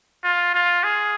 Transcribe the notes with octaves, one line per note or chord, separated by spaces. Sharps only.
F4
F4
G#4